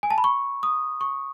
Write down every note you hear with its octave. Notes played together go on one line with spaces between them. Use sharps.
G#5
A5
B5
C#6
D#6
C#6